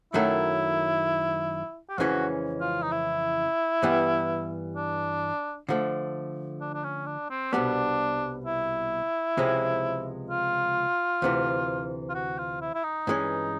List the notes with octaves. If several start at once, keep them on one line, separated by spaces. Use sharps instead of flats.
F#2 D#3 F#3 A3 E4
G4
F2 C#3 E3 G#3 C#4 F#4
F4
D#4
E4
G2 E3 G3 B3
D4
D3 F3 A3
D4
D4
C#4
D4
C4
C2 B2 G3 B3 D4
E4
C#2 C3 F3 G#3
F4
D2 C3 E3
F4
F#4
F4
E4
E4
D#4
G2 E3 G#3 C#4